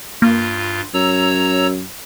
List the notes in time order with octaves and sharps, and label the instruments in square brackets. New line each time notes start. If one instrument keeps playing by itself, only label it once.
[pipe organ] G2 F4 [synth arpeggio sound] A#3
[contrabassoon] F#2 [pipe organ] C#5 A#5 E6